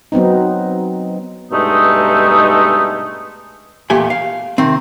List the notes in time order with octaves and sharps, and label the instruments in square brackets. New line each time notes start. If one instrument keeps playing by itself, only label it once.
[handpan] F#3 B3 C4 D#4
[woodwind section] G2 B2 G#3 A3 D#4
[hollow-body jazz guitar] E2 A#2 A3 G4 G#5
F5
C3 D#3 C4